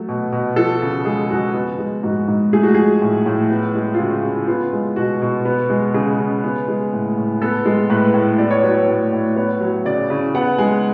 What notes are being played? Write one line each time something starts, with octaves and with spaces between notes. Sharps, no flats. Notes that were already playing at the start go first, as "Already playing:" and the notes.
Already playing: F#3 A3 A4
B2
B2
F3 A4
C#3
G#3 G#4
F2 F#4
B3
G#3
G#2 F#4
G#2
A3 G#4
F#4
F3 G#4
A2
A2
B3
G#3
F4
C#3 F#4
C#3
B3 F4
G#3
B2 F#4
B2
B3
G#3
C#3 G#4
C#3
B3
G#3
A2
A2
B3 A4
G#3
A2 B4
A2
B3 D5
C#5
F#3 B4
C#5
A2
A2
B3 C#5
F#3
C#3 D5
C#3
B3 F#5
G#3 G#5